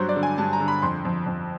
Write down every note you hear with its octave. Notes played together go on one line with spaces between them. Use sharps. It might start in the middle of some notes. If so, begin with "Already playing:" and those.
Already playing: G2 F#3 C5
D5
D3
G#5
G2 A5
A#5
D3
B5
F2 C6
F2
F2